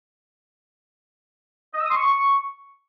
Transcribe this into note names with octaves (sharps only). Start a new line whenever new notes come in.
D#5
E6
D#6
C6
C#6